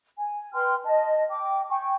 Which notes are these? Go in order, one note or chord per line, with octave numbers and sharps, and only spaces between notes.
G#5
B4 G5 C6 F6
D#5 A5
G5 D6
G5 G#5 C#6